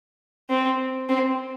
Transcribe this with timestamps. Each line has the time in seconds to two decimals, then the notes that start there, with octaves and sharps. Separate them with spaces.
0.49 C4
1.09 C4